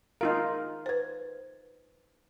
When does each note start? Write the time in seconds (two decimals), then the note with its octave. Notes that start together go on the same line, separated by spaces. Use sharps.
0.21 D#4 F4 A#4 F5
0.86 B4 C5